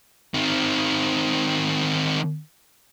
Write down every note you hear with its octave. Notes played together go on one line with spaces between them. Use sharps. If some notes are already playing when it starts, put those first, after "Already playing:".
D#3 C4